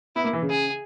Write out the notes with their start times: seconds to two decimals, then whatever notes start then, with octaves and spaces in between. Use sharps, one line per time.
0.16 B3 E4
0.24 A#3
0.33 E3
0.42 C#3
0.50 G#4